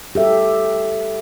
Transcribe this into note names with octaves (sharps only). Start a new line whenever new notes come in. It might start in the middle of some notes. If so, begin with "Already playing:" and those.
G4 A4 E5